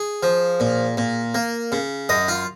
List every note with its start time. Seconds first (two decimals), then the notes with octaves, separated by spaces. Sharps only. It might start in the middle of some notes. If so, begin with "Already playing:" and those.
Already playing: G#4
0.23 F3
0.60 A#2
0.97 A#2
1.35 A#3
1.72 C#3
2.09 F#2 D#5
2.28 F4